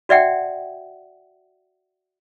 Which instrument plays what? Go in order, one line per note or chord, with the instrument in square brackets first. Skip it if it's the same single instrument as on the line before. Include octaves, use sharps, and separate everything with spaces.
[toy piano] F#4 D5 E5 F#5 G5